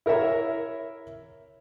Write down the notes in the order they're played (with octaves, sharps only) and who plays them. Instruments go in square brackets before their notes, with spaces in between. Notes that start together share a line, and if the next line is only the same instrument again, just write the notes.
[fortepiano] E4 A#4 C#5 E5